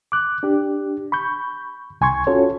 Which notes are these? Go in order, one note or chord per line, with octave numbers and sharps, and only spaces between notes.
D6 F#6
D4 G4
B5 C#6 G6
C2 G#5 C6 C#6 G#6
C#4 F4 F#4 A4 C#5